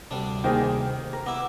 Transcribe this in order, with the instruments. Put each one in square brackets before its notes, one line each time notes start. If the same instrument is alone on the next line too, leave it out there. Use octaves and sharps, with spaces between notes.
[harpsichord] D2 G3 D4 [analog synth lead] C3
[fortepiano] D#3 A#3 G#4 [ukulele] C5 G5
[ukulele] A#4
[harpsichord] B3 E4 [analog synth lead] D6